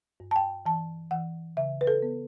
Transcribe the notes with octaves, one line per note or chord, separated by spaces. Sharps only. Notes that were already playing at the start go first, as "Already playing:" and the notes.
G2
A5
G5
E3 A5
E3 F#5
C#3 E5
B4
A4
B3